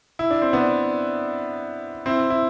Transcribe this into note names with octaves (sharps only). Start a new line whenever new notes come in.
E4
D4
C4
B3 D4
C4 E4
E4